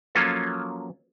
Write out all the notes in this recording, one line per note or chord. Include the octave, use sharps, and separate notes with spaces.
F3 F#3 A#3 C#4 F4 A4